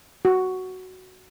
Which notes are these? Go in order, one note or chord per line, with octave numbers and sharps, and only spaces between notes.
F#4